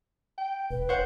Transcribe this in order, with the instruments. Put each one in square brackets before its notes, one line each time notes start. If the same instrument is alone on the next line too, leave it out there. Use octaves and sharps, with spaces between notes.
[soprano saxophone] G5
[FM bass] E1 [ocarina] B4
[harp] C5 F#5 [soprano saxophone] C#5